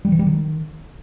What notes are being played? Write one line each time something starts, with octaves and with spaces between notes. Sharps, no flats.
G3
E3
G3
D#3